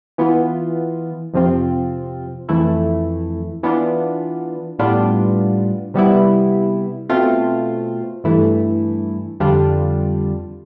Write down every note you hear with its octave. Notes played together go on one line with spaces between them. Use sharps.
E3 B3 F4
F2 C3 F3 C4 F4
F2 E3 A3 E4
E3 B3 D4 F4
A2 G3 B3 D4 F4
C3 G3 B3 E4
B2 A3 C4 F4
G2 E3 A3 E4
F2 D3 G3 D4 F4